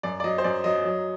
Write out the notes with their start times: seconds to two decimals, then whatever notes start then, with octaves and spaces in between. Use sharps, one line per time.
0.03 F#2 D5
0.20 D5
0.24 F#3 D#5
0.38 C5
0.44 F#2 D5
0.64 F#3 D#5
0.84 F#3